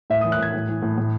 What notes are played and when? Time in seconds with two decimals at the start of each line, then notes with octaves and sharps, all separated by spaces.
0.10 A2 E5
0.21 D#6
0.24 E3
0.32 F#6
0.38 A2 G#6
0.54 A2
0.69 E3
0.82 A2
0.98 A2